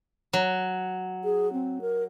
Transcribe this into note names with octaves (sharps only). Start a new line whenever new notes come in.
F#3
G#4
C4
A#4